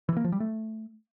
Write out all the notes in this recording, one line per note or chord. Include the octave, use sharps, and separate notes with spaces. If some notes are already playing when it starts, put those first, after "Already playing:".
E3
A#3
F3
G3
A3